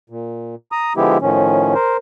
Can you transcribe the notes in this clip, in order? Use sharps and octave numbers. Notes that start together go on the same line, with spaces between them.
A#2
A#5 D#6
D3 F3 G#3 B3 E4 G4
A2 D#3 F3 C#4
A#4 C5